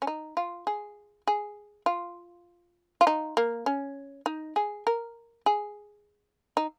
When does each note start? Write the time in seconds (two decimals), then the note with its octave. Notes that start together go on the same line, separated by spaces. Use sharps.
0.02 C#4
0.07 D#4
0.37 F4
0.67 G#4
1.27 G#4
1.86 F4
3.01 F4
3.07 D#4
3.37 A#3
3.66 C#4
4.26 D#4
4.56 G#4
4.87 A#4
5.46 G#4
6.57 D#4